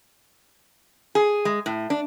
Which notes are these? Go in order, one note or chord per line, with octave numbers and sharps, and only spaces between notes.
G#4
G#3
A2
D4